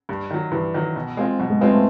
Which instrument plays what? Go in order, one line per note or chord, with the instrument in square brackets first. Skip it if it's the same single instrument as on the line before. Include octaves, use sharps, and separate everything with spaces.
[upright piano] G2
D#3 F#3
[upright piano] G2 [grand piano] E3
[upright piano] D#3 F#3
B2
G#3 C4 F4
[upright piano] B2 [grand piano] F#3
[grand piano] G#3
[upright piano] G#3 C4 F4 [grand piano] B3
[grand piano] A3